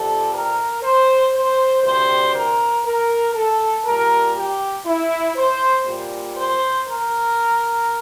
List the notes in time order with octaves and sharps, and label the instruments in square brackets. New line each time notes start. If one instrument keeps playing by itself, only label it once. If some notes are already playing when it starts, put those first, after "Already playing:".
Already playing: [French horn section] F2 C3 G3 A4
A#4
C5
C5
D2 C3 G3 C5
A#4
A#4
A4
A#2 G3 A#4
G4
E4
C5
A#2 G3
C5
A#4